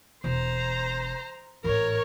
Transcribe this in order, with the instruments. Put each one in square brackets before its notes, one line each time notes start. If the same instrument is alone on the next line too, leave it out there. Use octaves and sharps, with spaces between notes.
[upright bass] E1 [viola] C5 A#5
[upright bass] A1 G#2 [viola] A#4 C#5